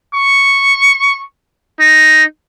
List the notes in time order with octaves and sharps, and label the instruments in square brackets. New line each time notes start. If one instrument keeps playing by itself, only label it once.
[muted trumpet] C#6
D#4